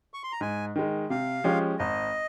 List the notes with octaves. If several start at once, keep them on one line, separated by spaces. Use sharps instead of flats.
C#6
C6
A#5
G#2 G#5
D#3 G#3
C3 F5
F3 G#3 C#4 G4
G#1 D#5